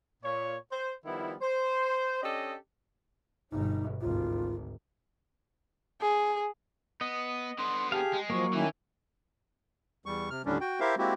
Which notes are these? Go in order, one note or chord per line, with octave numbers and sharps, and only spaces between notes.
A#2 C#5
C5
D#3 F3 G3 B3 E4
C5
C#4 D4 G4 A4 D#5
G1 B2 D#4
G#1 D2 F4
G#4
B3 D#5
D3 B3 C6
G4 G#4 F5 A5
G#3
F3 F#3 A#3 C#6
D#3 E3 C#4 E4
E2 G3 C#6
C3 F6
D#2 A2 D3 G3 C#4 D4
F#4 G5
E4 G4 A#4 C5 E5 F5
G#3 A#3 C4 E4 F#4 G4